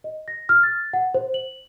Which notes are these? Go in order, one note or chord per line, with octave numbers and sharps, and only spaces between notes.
D#5
A#6
F6
A6
F#5
C5
F#7